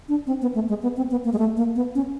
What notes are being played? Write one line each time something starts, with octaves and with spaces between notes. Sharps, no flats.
D4
C4
B3
A3
G#3
B3
C4
B3
A#3
G#3
A3
A#3
B3
C#4